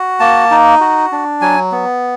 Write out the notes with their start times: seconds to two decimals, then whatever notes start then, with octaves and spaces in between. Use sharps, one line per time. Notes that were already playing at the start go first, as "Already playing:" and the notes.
Already playing: F#4
0.20 A#3 A5
0.51 D#4
0.81 F#4
1.12 D4
1.41 F#3 G#5
1.72 B3